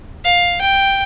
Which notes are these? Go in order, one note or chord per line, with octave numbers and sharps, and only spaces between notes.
F5
G5